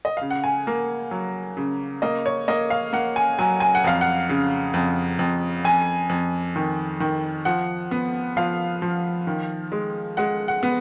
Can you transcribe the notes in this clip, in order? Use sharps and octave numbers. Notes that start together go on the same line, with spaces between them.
D#5
C#3 F5
F#5
G#5
A#3
F#3
C#3
A#3 D#5
C#5
A#3 D#5
F5
A#3 F#5
G#5
F#3 G#5
G#5
F#5
F2 F5
F#5
C#3
F2
F2
F2 G#5
F2
D#3
D#3
F3 F#5
B3
F3 F5
F3
D#3
G#3
G#3 F#5
F#5
B3